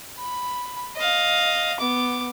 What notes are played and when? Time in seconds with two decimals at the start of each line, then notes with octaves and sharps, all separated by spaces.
0.18 B5
0.96 D#5 F5
1.80 B3 D6